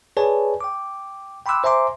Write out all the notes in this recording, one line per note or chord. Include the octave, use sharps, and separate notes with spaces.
G#4 B4 C#5 D5 G#5 A5
G5 D6
G5 B5 C6 D6 E6 F#6
C5 E5 G#5 A#5 C6 D6